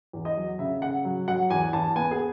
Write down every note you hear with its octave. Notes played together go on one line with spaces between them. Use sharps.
E2
D#5
F#3
C#3 E5
C#3 F#5
F#3
F#3 F#5
E2 G#5
E2 A5
B3 G#5
G#4